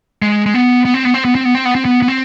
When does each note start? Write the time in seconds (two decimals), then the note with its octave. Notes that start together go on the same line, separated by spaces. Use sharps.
0.22 G#3
0.46 G#3
0.54 B3
0.85 B3
0.94 C4
1.05 B3
1.14 C4
1.25 B3
1.35 C4
1.45 B3
1.55 C4
1.65 B3
1.75 C4
1.85 B3
2.02 B3
2.08 C4